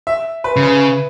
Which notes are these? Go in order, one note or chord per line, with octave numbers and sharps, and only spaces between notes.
E5
B4
C#3
B4